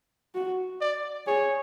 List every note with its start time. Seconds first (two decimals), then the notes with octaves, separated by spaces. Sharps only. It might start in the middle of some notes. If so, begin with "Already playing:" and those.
0.35 F#4
0.81 D5
1.27 G#4 C#5